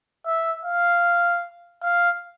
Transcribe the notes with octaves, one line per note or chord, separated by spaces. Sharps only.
E5
F5
F5